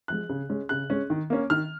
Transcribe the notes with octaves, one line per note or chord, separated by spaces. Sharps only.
F3 G#3 F#6
C#3
G#3 C#4
C#3 F#6
G#3 C#4
D#3
A#3 C#4
D#3 F6